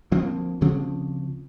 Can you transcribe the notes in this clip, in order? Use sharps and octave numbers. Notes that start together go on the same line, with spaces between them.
D2 F3 A#3 C4
D2 C#3 F3 C4